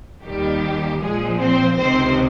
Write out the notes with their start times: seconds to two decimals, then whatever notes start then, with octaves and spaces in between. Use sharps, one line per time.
0.24 D#2 D#3 G3 G4
1.00 A#1 A#2 F3 G#3 G#4
1.38 C4 C5
1.76 C#2 C3 D#3 C4 C5